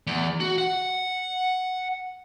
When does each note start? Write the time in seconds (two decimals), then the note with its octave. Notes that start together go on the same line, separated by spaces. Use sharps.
0.07 E2
0.40 F#4
0.58 F#5